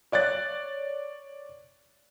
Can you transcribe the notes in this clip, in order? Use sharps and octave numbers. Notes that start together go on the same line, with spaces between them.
C#5 D5 F#6 A6